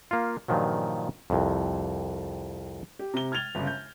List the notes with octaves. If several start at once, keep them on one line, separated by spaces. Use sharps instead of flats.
A#3 F4
G2 A#2 D#3 F3 F#3
C2 F2
G4
C3 A#5 G7
F6 G#6 A6 F7 G7
G1 C#3
G6